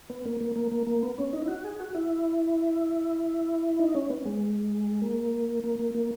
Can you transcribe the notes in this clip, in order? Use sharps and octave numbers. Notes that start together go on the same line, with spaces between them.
B3
A#3
A#3
A#3
A#3
A#3
B3
C#4
D#4
E4
F#4
G#4
F#4
E4
D#4
C#4
B3
G#3
A#3
A#3
A#3
A#3